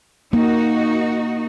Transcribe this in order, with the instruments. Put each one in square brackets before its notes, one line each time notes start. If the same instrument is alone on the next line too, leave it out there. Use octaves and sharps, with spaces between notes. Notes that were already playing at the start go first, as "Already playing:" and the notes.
[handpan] A#3 [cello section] D#4 F#4